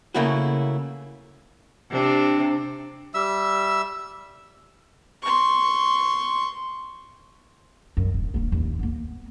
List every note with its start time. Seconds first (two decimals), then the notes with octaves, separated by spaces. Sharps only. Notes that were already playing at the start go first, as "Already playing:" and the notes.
0.14 C#3 A3 A#3 E4 F#4
1.90 C3 D4
3.14 G3 E5 E6
5.22 C6 C#6
7.97 F#2
8.14 D#1
8.34 D1 A#3
8.52 A1 D#2
8.79 A#3 B3